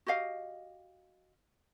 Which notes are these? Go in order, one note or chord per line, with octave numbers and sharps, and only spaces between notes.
F#4 G4 D#5 F5